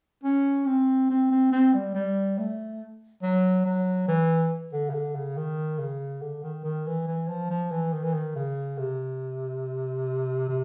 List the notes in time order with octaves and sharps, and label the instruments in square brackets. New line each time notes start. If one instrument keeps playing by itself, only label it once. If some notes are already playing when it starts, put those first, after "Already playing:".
[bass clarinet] C#4
C4
C4
C4
C4
G3
G3
A3
F#3
F#3
E3
D3
C#3
D3
C#3
D#3
C#3
D3
D#3
D#3
E3
E3
F3
F3
E3
D#3
E3
D#3
C#3
C3
C3